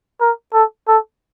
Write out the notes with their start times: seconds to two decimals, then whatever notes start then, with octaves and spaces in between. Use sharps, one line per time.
0.21 A#4
0.54 A4
0.88 A4